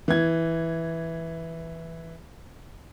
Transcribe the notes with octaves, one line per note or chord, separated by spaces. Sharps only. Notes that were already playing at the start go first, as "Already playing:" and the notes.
E3 G#6